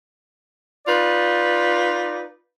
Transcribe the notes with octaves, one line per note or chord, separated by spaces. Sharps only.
D#4 F4 B4 D5